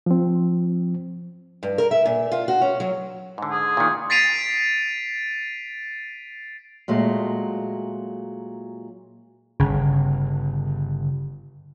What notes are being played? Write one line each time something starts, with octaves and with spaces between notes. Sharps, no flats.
F3 C4
G2
A#4
E5
A#2
F4
F#4
C#4
F#3
G#2 D3
G#4
A#2 D#3
A6 B6 C7 D7 D#7 F7
A#2 F#3 G#3 A3
G1 C#3